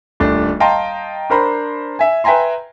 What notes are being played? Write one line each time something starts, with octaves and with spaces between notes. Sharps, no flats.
D#1 A3 D4
D#5 F5 G5 A5 A#5 C6
D4 A#4 C5 B5
E5 G#5
B4 E5 G5 G#5 A#5 C6